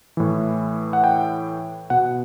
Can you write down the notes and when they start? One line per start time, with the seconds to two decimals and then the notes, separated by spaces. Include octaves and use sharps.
0.17 A2 E3
0.93 F#5
1.04 G5
1.90 B2 F#5